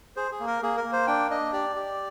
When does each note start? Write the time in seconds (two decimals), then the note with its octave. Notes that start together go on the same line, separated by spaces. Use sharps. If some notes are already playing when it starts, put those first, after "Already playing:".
0.16 G#4 C5
0.31 G#4
0.40 A#3
0.47 A#4
0.63 A#3 G#4
0.77 A#4
0.84 A#3
0.93 C5
1.07 D4 G5
1.31 D4 D#5
1.53 G4 D5
1.76 G4